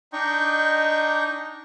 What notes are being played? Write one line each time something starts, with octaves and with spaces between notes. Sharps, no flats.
D4 D#4 D#5 G5 C#6